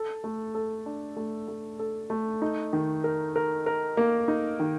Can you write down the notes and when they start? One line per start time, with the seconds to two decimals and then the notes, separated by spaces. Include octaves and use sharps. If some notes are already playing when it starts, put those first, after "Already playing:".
Already playing: A4
0.24 A3
0.55 A4
0.86 D4
1.17 A3
1.48 A3
1.79 A4
2.10 A3
2.42 D#4
2.73 D#3
3.04 A#4
3.36 A#4
3.66 A#4
3.97 A#3
4.28 D#4
4.60 D#3